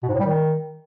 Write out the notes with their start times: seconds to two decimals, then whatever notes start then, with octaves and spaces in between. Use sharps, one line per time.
0.03 B2
0.09 G#2
0.14 A2
0.20 G3
0.25 D#3